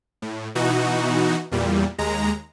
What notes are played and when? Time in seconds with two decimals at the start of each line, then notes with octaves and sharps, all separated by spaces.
0.22 A2
0.55 B2 E3 D#4 F#4
1.52 E2 A#2 G3
1.98 D#2 G#3 A#5